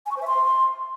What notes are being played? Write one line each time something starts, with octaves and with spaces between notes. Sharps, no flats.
G#5
C#6
C5
E5
C6